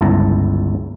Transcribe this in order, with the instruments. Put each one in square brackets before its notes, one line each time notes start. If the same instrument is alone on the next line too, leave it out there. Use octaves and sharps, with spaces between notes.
[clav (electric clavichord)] G1 C#2 E4 A5 A#5